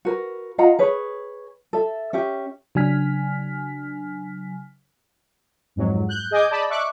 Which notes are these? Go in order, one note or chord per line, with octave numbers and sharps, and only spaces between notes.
F#4 A#4 B4
F4 D#5 F#5 A#5
G#4 B4 C#5
A4 E5
C#4 G4 E5
C#3 F#3 D4 G#5 F6 B6
F2 G#2 F#3
F#6 G6
G#4 D#5 G#5 D6 D#6 G6
D5 D#5 A5 B5
E5 C#6 D6 F#6